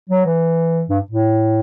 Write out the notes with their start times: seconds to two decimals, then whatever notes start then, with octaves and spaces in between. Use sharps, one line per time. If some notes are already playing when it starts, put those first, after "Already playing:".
0.09 F#3
0.26 E3
0.89 G2
1.11 A2